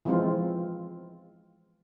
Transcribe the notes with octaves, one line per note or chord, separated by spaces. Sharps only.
E3 F3 G#3 C4 F4